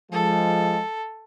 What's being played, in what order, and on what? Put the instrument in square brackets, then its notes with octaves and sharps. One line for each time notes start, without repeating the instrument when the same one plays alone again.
[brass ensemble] F3 G#3 [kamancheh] A4